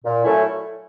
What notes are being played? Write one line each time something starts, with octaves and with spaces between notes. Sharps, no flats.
A#2
F#3 A3 C#4 E4